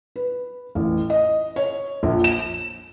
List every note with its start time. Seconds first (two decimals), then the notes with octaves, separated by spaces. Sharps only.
0.16 B4
0.75 A1
1.10 D#5
1.56 C#5
2.03 A#1
2.24 E7